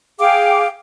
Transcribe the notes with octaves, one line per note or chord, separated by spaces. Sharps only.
G#4 F5 G5 D6